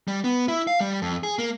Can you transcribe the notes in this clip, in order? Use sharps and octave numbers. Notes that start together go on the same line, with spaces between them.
G3
B3
E4
F5
G3
F2
G#4
A#3